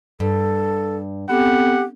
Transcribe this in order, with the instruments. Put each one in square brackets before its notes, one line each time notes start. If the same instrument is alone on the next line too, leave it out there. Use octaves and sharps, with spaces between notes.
[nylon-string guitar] G2 [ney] A4
[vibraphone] B3 C4 A4 [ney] G4 [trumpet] F#5